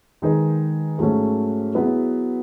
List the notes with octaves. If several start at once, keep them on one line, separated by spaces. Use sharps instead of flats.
D#3 G#3 D#4 G#4 B4
G#2 F#3 A3 C#4
F#3 B3 E4 G#4 B4